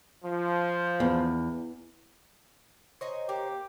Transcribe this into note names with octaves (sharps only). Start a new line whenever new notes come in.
F3
E2
D#4 C5 C#5 D#5 G#5
A#3 G4